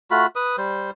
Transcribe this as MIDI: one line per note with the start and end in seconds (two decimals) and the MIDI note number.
0.11 0.27 57
0.11 0.27 65
0.11 0.27 66
0.11 0.27 83
0.36 0.56 71
0.36 0.56 87
0.58 0.91 55
0.58 0.91 72